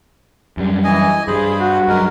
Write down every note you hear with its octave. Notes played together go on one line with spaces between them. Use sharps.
F#2 G3
E3 D#5 G#5
G2 G3 G#4 C5 B5
F#4
G2 F#3 G#3 A#4